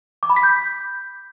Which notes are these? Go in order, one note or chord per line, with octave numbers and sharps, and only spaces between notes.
D6
B5
B6
G6